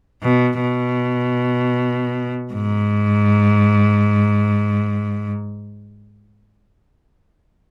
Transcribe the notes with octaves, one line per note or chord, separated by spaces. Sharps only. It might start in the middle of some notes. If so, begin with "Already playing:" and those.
B2
B2
G#2